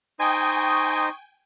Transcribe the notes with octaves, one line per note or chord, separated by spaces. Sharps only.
D#4 C5 D#5 G5 G#5 C#6 D#6